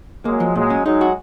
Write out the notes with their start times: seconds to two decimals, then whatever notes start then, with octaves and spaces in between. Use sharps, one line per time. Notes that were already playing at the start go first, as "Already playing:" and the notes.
0.24 F#3 G#3 A#3
0.40 F3
0.55 A#2 F#3 G#3
0.70 C#4
0.85 F#3 G#3 D#4
1.01 F#4